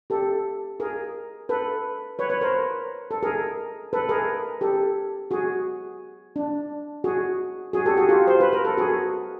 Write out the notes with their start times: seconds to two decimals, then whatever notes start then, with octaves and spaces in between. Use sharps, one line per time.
0.10 G4 A4
0.80 G#4 A#4
1.49 A4 B4
2.19 B4 C#5
2.30 B4 C#5
2.41 A#4 C5
3.11 A4
3.23 G#4 A#4
3.93 A4 B4
4.09 G#4 A#4
4.61 G4 A4
5.31 F#4 G#4
6.36 D4
7.04 F#4 G#4
7.73 F#4 G#4
7.86 G4 A4
7.97 F#4 G#4
8.09 F4 G4
8.27 C5
8.40 B4
8.53 A#4
8.65 A4
8.77 F#4 G#4